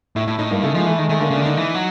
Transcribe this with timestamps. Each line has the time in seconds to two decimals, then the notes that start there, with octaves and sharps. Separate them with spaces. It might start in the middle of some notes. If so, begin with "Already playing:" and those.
0.16 A2 E4
0.27 A2 E4
0.38 A2 D#4
0.51 G2 A#3
0.62 C#3 A3
0.74 F3 G#3
0.86 E3 A3
0.98 D#3 G#3
1.09 D#3 A3
1.20 D3 A#3
1.30 C#3 D4
1.41 D3 D#4
1.57 E3
1.74 F#3